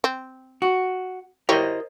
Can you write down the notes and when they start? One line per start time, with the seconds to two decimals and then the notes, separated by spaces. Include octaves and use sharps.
0.04 C4
0.62 F#4
1.49 E4 G4 A#4 C5 C#5 D#5